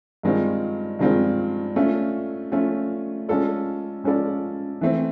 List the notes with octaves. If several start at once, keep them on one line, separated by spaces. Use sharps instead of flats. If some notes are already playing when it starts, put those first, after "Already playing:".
G2 D#3 G#3 C4 F4
G2 D#3 G#3 C4 F4
A3 C#4 F4
A3 C#4 F4
G#3 C#4 F4 A4 D5
G#3 C#4 F4 A4 D5
E3 A3 C4